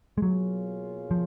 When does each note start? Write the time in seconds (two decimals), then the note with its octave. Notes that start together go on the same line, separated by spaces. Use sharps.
0.18 G#3
0.22 B2 F#3 A#3 F4 G#4 C#5
1.11 F3